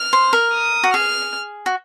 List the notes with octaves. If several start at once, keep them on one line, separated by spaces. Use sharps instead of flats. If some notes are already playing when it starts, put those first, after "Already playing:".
Already playing: F6
C5
A#4
D#6
F#4
G#4 F6
F#4